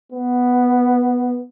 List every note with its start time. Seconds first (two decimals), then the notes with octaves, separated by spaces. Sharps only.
0.12 B3